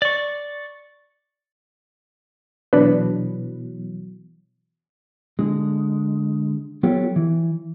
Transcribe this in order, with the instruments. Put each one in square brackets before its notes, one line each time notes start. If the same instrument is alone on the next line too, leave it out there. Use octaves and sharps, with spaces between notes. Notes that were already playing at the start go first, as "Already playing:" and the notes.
[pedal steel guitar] D5 C#6
[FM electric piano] B2 E3 F#3 [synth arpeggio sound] D4 B4
[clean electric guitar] D3 G#3
F#3 B3 F4 G4 A4 C#5
E3